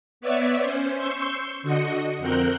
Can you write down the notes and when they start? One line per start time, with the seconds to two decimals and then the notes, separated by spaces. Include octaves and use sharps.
0.21 B3 B4 C#5 D5 E5
0.59 C#4 C5
0.96 C6 C#6 E6 G6
1.63 D3 F#4 D#5 C#7
2.19 F2 C4 A#4 F#6 G6